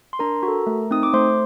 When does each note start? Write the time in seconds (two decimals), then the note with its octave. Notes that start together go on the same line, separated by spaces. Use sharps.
0.13 C6
0.19 D4 A#4 A#5
0.43 F#4
0.48 A4
0.67 A3
0.91 C4 D#4 D#6
1.03 D6
1.13 A3 C5 C6